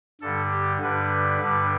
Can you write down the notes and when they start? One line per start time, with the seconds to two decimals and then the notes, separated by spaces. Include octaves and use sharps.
0.21 G2 D3 G3 A4
0.52 G4
0.81 G2 D3 G3 B4
1.41 G2 D3 G3